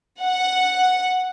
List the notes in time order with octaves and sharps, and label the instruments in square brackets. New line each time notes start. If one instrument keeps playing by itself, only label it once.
[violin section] F#5